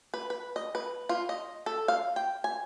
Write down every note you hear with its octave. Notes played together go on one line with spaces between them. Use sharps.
B4
B4
D#5
B4
F4
D#5
A4
F5
G5
G#5